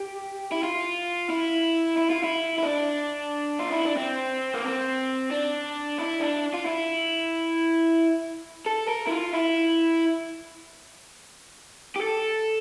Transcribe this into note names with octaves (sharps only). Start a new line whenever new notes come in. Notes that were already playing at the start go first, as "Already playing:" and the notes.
Already playing: G4
E4
F4
E4
E4
F4
E4
E4
D4
F4
E4
D4
C4
A#3
C4
D4
E4
D4
F4
E4
A4
A#4
E4
F4
E4
G4
A4